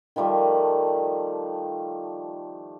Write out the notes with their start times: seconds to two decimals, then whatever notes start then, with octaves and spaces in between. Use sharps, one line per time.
0.16 D#3 F3 G3 A3